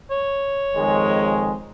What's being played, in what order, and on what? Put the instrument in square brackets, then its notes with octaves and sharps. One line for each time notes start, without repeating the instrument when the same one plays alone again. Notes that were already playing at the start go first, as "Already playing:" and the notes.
[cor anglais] C#5
[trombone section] F2 D#3 G#3